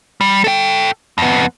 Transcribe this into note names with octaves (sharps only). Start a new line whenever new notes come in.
G3
A4 G5
F2 B3